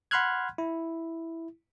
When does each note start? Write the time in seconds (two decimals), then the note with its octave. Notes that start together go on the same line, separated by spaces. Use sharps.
0.11 F#5 B5 C6 F6 F#6 G#6
0.58 E4